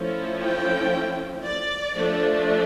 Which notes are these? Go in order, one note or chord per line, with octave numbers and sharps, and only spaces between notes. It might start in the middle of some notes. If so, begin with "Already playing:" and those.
Already playing: F3 A3 C#4 E4
G5
D5
F3 A3 D4